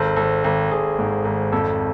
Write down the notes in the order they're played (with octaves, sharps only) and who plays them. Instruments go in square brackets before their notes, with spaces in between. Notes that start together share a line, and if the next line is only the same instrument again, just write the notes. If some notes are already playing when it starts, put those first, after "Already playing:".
Already playing: [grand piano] G#1 [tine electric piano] A4 C5
[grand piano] G#1 [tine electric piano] A4
[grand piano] G#1
[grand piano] G#1 [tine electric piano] G#4
[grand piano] G#2
G#1
[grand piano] F2 [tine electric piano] A4